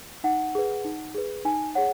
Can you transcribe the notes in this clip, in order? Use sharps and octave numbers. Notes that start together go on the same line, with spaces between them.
D#4 F#5
G#4 B4
D#4
G#4 B4
D#4 G#5
G#4 C#5 F#5